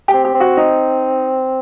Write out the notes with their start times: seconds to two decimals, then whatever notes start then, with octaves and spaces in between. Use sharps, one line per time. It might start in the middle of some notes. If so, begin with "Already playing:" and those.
0.08 G4
0.14 C4
0.25 G4
0.35 C4
0.40 F#4
0.57 D#4